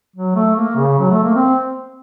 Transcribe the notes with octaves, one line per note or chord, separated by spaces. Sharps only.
F#3
A3
A#3
C#3
F#3
A3
A#3
C4